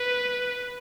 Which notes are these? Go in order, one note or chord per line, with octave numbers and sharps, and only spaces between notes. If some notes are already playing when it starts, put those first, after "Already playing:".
Already playing: B4